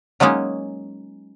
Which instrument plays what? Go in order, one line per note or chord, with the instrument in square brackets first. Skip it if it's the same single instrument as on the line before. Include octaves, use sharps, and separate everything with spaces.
[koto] F#3 G#3 A#3 C#4 D#4